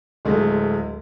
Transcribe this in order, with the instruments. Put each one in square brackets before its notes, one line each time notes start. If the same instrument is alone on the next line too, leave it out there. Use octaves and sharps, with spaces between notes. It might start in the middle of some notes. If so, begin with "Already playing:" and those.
[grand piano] D1 G#3 A3